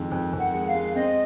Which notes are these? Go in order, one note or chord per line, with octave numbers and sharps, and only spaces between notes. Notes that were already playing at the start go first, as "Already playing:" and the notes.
Already playing: F2 D#3 G#3
F2
F2
F#5
G#3
F5
G#3
C4 D#5